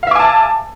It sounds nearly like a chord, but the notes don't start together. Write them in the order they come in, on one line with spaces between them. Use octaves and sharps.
F5 E5 D6 G#5 A5